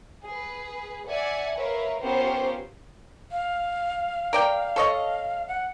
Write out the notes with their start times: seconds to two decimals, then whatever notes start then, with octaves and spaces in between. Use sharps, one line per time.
0.24 G#4 B4
1.08 D5 E5 F#5 G#5
1.55 A#4 B4 C#5 E5 F5
2.01 B3 C#4 F4 G4 A#4 C5
3.32 F5
4.33 A#4 D5 G5
4.76 A4 C#5 D#5
5.48 F#5